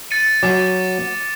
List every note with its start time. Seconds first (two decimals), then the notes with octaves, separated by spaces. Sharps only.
0.11 A6 C#7 D#7
0.43 F#3 G#5 D6